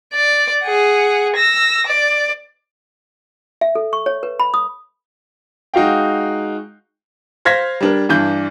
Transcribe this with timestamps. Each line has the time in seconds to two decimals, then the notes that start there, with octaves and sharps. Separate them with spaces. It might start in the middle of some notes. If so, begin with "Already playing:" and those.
0.14 D5
0.63 G#4 F#5
1.36 E6 A#6
1.87 D5
3.61 E5
3.75 A4
3.93 C#6
4.06 C#5
4.23 B4
4.40 B5
4.54 D#6
5.74 G#3 D#4 F#4 F5 G5
7.45 C5 F5 G#6 A#6 B6
7.81 G3 D4 A#4
8.09 G2 E3 D4 G6